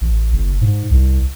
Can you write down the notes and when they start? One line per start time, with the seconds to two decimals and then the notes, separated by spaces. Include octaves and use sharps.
0.01 A1
0.33 F#1
0.61 G#2
0.90 C2